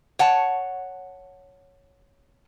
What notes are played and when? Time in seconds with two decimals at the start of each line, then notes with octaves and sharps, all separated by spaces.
0.19 C#5 F#5 A5